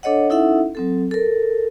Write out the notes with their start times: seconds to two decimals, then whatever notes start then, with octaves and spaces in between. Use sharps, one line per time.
0.03 D4 A4 C#5 D#5 F#5
0.29 C#4 D#4 E4 A4 E5 F#5
0.75 F#3 C4 A4
1.11 A4 A#4